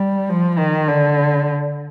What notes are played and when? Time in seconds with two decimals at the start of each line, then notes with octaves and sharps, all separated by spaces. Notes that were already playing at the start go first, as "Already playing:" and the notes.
Already playing: G3
0.30 F3
0.58 D#3
0.88 D3